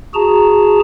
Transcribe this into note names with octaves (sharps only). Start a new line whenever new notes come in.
F#4 G#4 A5 A#5